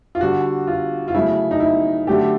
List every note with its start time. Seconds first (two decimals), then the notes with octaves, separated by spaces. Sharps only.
0.15 F4
0.21 D3 G3 F#4
0.67 F4
1.08 F4
1.14 C#3 F#3 A3 E4
1.51 D#4
1.60 E4
2.07 D3 F#3 A3 G4